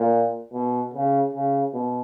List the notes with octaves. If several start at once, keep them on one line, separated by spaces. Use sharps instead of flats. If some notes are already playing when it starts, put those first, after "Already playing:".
Already playing: A#2
B2
C#3
C#3
B2